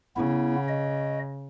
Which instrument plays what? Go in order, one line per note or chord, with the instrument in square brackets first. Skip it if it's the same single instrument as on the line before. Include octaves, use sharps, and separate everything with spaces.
[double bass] C#3 [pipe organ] B3 E4
[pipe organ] D#5